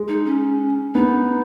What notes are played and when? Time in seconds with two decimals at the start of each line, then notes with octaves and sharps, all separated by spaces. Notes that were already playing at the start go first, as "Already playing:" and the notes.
Already playing: G#3
0.08 D#4
0.26 C#4
0.95 B3 D#4